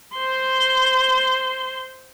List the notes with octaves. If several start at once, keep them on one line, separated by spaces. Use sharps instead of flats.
C5 C6